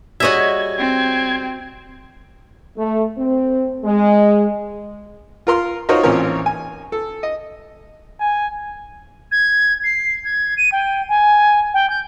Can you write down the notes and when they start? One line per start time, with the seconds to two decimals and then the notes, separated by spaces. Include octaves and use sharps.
0.20 G3 F#4 G#4 C#5 D#5 E5 G#6
0.79 C4
2.77 A3
3.17 C4
3.84 G#3
5.47 F4 A#4 C6 F6
5.89 D#4 F4 F#4 A#4 C5 C#5
6.03 A1 A#2 C4 C#4 A#4 C#5
6.46 G#5
6.92 A4
7.23 D#5
8.20 G#5
9.31 G#6
9.84 C7
10.24 G#6
10.57 D#7
10.72 G5
11.08 G#5
11.73 G5
11.89 G6